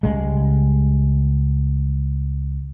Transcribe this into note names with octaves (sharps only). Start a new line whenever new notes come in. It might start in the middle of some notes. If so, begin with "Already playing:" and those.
C#2 G3 G#3